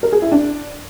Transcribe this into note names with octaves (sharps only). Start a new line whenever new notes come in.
A#4
G#4
E4
D4